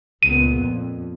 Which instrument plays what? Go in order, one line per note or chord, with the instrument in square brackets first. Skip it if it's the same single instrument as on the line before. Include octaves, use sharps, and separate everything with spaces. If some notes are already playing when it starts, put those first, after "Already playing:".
[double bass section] C#2 A#2 B3 [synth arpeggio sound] D#7
[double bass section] F2